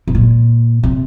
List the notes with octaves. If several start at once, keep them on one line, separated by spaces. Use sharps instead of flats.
C3
A#2
C3